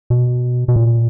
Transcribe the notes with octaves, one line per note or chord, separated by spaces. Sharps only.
B2
B2
A#2